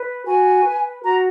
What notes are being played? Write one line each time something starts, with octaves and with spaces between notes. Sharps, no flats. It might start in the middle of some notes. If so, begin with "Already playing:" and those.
Already playing: B4
F#4 G#5
B4
F#4 A#5